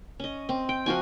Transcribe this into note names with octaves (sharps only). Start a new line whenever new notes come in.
C#4 D#5
C4
G5
F3 F4 F#4 G#5